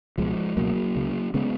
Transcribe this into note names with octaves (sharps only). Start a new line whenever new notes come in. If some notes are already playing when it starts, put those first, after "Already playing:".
C#2 B2 F3 G#3
C#2 B2 F#3 A#3
C#2 C#3
C#3 G#3 B3